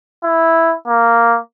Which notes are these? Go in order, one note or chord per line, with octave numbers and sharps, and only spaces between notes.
E4
A#3